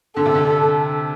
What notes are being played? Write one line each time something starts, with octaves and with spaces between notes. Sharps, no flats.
D3 A4
C3
D3